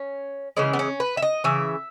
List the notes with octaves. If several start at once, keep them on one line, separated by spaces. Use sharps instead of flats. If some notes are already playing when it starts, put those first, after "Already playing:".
Already playing: C#4
C#3 E3 G#3 C#4
B3
C#4
B4
E5
D#5
C#3 E3 E5